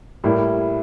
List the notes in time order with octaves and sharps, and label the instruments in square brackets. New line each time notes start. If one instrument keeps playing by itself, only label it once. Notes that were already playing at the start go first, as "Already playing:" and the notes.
[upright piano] A2 G3 A#3 E4